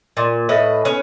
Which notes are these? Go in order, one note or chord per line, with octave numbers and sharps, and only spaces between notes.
A#2
A2 B4 D#5
C#4 B4